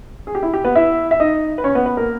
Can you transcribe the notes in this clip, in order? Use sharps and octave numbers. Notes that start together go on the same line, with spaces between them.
G#4
G4
E4
G4
B3 B4
E4 E5
E5
D#4 D#5
B4
C#4 C#5
B3 B4
B3 B4
A#3 A#4